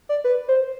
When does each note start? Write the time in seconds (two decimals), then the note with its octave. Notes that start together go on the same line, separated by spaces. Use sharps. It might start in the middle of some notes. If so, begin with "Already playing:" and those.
0.09 D5
0.24 B4
0.48 C5